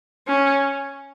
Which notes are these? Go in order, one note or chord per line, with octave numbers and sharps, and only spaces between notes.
C#4